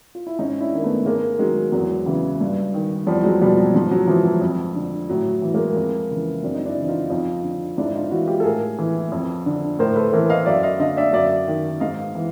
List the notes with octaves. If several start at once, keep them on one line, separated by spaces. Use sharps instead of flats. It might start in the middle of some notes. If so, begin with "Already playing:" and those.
F4
E4
G#2 C#4 D#4
D4 E4
D#3 A#3
A3 B3
G#2 G#3 A#3
D#3 F#3 G#3
E2 F#3 G#3
C#3 E3
G2
D#3
E2 F3 G3
F#3 G#3
B2 F3 G3
F#3
G#2 F3
F#3
E3 F3
F#3
F2
D3
A2 F#3
E3
G#3 A#3
F2
C#3 E3
F#2 C4 D4
D#4
D4 E4
C#3 E3
D#4 F4
F2 D#4 F4
D3
G#2 D4 E4
D#4 F4
E3 E4 F#4
F4 G4
A4
A2 G#4 A#4
E3
F2
D3
A2 A#4 C5
A4 B4
E3 A#4 C5
D#5 F5
F#2 D5 E5
D#5 F5
D3 D#5 F5
D5 E5
F#2 D5 E5
D#3
G#2 D#5 F5
E3